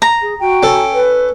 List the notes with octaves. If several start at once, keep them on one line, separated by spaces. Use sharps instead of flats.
A#5
G#4
F#4 G5
C#4 A4
B4